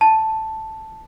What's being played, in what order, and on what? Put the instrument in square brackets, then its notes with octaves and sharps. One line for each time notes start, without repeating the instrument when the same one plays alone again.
[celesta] A5